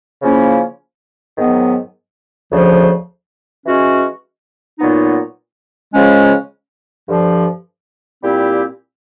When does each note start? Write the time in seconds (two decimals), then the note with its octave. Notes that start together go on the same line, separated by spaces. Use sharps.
0.22 C#3 F3 A#3 C#4 E4
1.37 G#2 D#3 F#3 B3
2.51 D2 C#3 F3
3.66 E3 G#3 C#4 F#4
4.79 A#2 F#3 B3 D#4
5.94 C#3 F3 G#3 C#4
7.08 G2 D3 F3
8.22 A#2 G3 C4 E4 G4